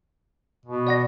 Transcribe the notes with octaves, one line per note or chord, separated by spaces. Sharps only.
B2
D5 F#5 A#6